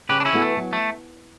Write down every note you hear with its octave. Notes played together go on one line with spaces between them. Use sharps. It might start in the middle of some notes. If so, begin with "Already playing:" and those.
C#3 G4 B4
D4
C#4 E4
E3 B3 F#4 A4
A3
F#3
A3